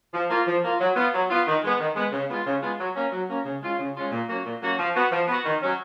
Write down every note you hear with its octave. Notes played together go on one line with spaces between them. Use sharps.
F3
A#3 F4
F3
A#3 F4
F#3
B3 F4
F#3
B3 F4
D#3
G#3 B3
D#3
G#3 B3
C#3
G#3 B3 F4
C#3
G#3 B3 F4
F#3
A#3 C#4
F#3
A#3 C#4
C#3
G#3 C#4 F4
C#3
G#3 C#4 F4
A#2
F#3 A#3 C#4 F#4
A#2
F#3 A#3 C#4 F#4
F3
B3 F#4
F3
B3 F#4
D#3
F#3 C#4